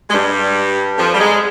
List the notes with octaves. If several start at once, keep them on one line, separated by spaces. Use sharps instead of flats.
G#3
G2 G3
F2 F3
G3
G#2 G#3